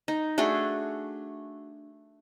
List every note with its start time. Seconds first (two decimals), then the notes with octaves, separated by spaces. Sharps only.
0.08 D#4
0.38 A3 D4 F#4 G#4